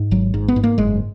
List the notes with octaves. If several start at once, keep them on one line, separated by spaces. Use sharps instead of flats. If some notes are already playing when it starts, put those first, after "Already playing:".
Already playing: G#2
G#1 F#3
G#2
B3
G#2
A#3
F#1 G#3